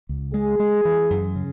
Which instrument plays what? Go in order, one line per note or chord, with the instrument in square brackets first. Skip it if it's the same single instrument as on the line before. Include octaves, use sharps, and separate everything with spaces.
[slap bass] C#2
[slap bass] G#3 [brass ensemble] G#4
[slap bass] G#3
E3
F#2
C#3